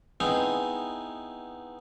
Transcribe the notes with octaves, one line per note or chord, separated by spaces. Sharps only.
B3 C4 D#4 E4 G#4